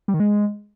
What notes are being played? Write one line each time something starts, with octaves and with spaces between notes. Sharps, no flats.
G3
D#3
G#3